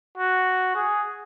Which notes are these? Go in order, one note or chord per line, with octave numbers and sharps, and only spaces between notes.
F#4
G#4